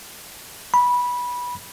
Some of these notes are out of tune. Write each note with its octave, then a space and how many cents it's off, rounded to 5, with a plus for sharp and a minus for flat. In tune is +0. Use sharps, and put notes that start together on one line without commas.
B5 -15